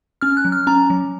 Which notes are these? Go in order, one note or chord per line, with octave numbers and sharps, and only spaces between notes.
C#4 F6
F#6
F#3
F6
C#4 A#5
F#3